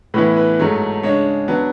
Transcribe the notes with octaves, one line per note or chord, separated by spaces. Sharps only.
A2 E3 B3 E4 B4
B4
G#2 F#3 A3
C#3 G#3 D4 C#5
F#3 B3 D4